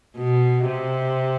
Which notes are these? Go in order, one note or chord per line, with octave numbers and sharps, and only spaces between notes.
B2
C3